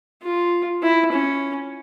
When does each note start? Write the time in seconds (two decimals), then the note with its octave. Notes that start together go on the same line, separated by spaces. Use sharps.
0.23 F4
0.83 E4
1.12 C#4